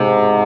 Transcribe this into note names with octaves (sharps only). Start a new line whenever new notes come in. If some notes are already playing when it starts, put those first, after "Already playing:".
Already playing: G#2 C3